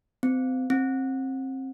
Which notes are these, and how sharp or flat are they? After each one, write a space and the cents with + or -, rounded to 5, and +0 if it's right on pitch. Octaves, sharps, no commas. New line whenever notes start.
C4 -30
C4 +25